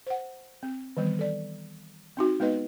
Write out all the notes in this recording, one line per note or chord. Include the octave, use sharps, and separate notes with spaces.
C5 F#5
C4
D#3 E3 G3 B3
A4 D5
C4 D#4 F#4
G#3 B3 D#4 B4 D#5